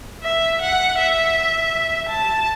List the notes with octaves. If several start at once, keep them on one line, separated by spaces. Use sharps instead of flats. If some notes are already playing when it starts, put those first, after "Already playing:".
E5
F#5
E5
A5